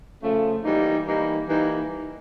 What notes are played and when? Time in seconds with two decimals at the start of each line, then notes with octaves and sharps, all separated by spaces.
0.22 C#3 F3 A3
0.64 E3 G3 A#3 D#4
1.06 E3 G3 A#3 D#4
1.49 E3 G3 A#3 D#4